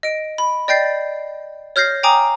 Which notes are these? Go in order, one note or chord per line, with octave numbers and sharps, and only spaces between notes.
D#5 D7
B5
D5 D#5 G5 G6 A6 C7
C#5 F6 G6 A#6 C7
G5 G#5 A#5 D6 D#6